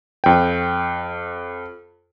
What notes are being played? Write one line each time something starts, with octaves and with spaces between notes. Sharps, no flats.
F2 G5